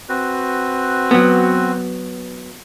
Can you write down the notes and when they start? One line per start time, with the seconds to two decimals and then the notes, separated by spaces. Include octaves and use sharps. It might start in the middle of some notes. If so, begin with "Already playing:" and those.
0.09 C4 F#4 B4
1.11 F#3 B3